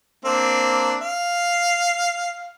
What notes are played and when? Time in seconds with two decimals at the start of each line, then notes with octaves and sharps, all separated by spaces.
0.25 A#3 C4 D4
1.01 F5